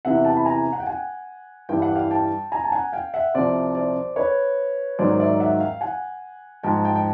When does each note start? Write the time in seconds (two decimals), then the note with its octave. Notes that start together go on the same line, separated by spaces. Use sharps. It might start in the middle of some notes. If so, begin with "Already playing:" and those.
0.05 E2 C3 E3 E5 F#5
0.25 G5 A5
0.37 B5
0.45 G#5 A#5
0.73 F#5
0.80 G5
0.87 F#5 G#5
1.69 G2 E3 G3 G5
1.82 F#5
1.95 F5 G5
2.11 G5 A5
2.52 G#5 A#5
2.64 A5
2.72 F#5 G#5
2.92 F5 G5
3.14 E5 F#5
3.34 C2 C3 F3 C5 D5
3.75 C5 D5
4.16 B4 C#5
4.99 G#2 D#3 F#3 C5 D5
5.19 D5 E5
5.40 E5 F#5
5.60 F5 G5
5.81 F#5 G#5
6.63 G#2 F3 G5 A5
6.84 G5 A5
6.95 G5